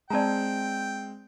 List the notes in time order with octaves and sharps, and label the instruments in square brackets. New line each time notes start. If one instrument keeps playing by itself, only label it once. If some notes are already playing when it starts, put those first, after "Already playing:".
[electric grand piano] G#3 C4 [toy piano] D5 A5 A#5 [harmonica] G5